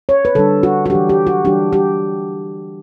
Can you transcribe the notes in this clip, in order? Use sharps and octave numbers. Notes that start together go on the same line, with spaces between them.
C#5
B4
D3 G3 D4 A4
F#4
F#4
E3 G3 D4 G4
G4
F#4
E3 G3 D4 G4
G4